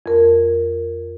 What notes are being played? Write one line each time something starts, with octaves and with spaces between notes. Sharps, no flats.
F2 A#4